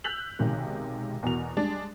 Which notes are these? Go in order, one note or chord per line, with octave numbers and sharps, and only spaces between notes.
E6 F#6 G6 B6 F7 F#7
B1 C3 D#3 G#3
E2 B2 F#4 A#4 F7
G3 G#3 D4